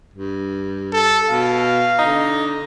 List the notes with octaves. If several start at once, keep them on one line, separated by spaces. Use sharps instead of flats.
G2
A4
B2 F5
D3 D#4